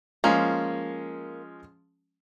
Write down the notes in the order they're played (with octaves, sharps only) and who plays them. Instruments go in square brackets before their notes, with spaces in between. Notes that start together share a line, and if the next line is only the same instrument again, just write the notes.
[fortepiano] F3 G#3 C#4 [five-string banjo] A#3